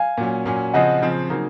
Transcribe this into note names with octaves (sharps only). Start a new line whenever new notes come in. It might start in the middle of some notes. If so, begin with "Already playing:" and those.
Already playing: F5 G#5
A#2 F#3 C#4
A#2 F#3 C#4
C#3 F3 C4 D#5 F#5
C#3 F3 C4
C#3 F#3 A#3 D#4